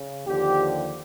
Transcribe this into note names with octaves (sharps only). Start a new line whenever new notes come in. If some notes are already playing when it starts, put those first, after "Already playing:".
Already playing: C#3
D#2 D3 F3 G4